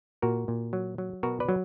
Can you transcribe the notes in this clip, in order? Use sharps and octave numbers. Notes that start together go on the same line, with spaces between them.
A#2 F#4 A#4
A#2
F#3
F#3
B2 F#4 A#4
B4 D5
F#3